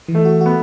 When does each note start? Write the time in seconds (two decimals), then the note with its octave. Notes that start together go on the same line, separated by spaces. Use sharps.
0.08 E3
0.15 A3
0.25 F#4
0.41 B3 F#4